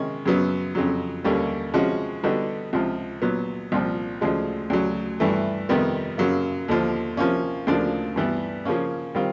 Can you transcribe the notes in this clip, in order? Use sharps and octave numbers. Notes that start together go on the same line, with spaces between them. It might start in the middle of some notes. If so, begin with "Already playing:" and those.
Already playing: C3 D#3 G#3 C#4
F#2 C#3 F#3 B3
F2 C#3 F#3
D#2 D3 G3 A#3 C#4
C3 F3 G#3 C#4 F#4
D3 G3 B3 D#4 F#4
C#2 C3 F3
A#2 F#3 B3
C2 A#2 F3
D2 C#3 F3 G#3
D2 C#3 F#3
G2 E3 A3
F2 C3 D#3 G3 B3
F#2 C#3 F#3 A#3
D#2 D3 F3
C3 F3 A#3 C#4
D2 C#3 F3 A#3 D4
G2 E3 G3 B3
C#3 F3 A#3 C#4
D#3 G3 C4 F4